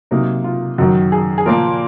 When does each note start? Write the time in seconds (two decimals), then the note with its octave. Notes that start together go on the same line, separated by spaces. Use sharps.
0.11 C3 F#3 A#3 D#4
0.44 F4
0.78 F#2 D#3 F#3 F#4
1.12 G#4
1.38 G#4
1.46 A#2 F3 A#3 A#4